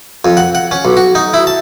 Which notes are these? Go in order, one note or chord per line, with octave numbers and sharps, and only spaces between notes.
F2
F#5
F#5
C#4
B1
F#4
D#4
E4
A5